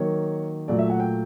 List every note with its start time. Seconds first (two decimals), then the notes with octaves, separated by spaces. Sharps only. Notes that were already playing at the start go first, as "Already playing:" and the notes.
Already playing: D#3 F#3 A#3 C#5
0.68 A#2 F#3 A3 D5
0.79 E5
0.90 F#5
1.00 G5